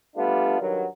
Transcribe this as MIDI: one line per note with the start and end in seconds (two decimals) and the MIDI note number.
0.16 0.57 55
0.16 0.57 57
0.16 0.57 59
0.16 0.57 62
0.16 0.57 65
0.61 0.85 43
0.61 0.85 51
0.61 0.85 54